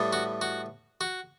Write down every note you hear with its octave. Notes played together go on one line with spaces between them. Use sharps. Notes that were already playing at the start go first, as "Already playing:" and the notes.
Already playing: A2 G3 B3
F#4
F#4
F#4